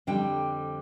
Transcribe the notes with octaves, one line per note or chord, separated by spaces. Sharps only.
F2 D3 G3 D4 G5